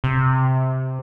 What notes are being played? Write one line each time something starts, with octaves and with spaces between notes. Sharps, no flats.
C3